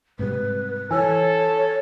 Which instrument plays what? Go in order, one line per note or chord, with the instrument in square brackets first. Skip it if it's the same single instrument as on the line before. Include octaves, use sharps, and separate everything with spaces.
[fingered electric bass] G#2 C3 G3 [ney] B4
[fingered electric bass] E3 [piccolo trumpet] A4 [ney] C#5 [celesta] G#5 E6